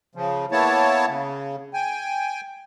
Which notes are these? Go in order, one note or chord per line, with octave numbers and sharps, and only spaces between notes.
C#3 F3
A#3 B3 E4 C#5 A5
C#3
G5 G#5